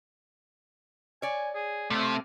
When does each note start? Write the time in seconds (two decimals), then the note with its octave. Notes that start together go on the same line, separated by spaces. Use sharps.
1.22 C#5 D5 G#5
1.55 G#4
1.90 C3 A3 C4 F4